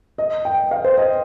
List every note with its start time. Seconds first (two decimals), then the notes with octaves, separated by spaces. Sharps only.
0.18 D#5
0.45 G5
0.71 F5
0.84 C5
0.98 D#5